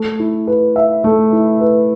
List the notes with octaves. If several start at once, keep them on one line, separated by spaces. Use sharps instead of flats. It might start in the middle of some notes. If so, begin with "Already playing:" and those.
Already playing: A3
E4
B4
E5
A3
E4
B4